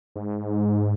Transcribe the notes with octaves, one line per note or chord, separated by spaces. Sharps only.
G#2